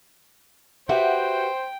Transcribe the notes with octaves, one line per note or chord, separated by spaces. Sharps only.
F#4 G4 B4 C5 E5 G5